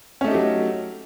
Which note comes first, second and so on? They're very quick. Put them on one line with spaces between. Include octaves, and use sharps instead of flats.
C#4 A3 D#4 G4 F#3